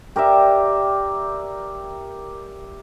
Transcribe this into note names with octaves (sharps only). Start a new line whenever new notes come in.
G4 A#4 D5 E5